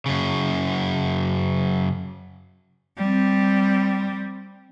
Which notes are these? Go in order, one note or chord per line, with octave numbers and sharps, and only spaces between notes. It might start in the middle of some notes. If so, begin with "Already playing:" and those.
F#2 C#3
G3 C4